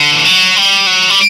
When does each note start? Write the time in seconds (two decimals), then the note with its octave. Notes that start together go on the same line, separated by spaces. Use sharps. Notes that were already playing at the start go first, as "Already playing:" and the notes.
Already playing: D3
0.12 E3
0.25 F#3
0.56 G3
0.87 F#3
1.10 G3